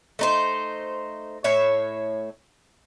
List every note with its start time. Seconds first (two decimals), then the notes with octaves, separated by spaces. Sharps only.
0.19 A3 D#4 C5
1.44 A2 C#5 E5